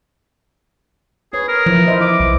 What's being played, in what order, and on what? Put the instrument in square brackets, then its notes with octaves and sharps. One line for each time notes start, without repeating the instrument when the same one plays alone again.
[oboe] G#4 [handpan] B4 C#5
[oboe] A#4
[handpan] E3 E4 B4 [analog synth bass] F3
[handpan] C5 D#5 E5
[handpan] E4 [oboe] D6
[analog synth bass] C2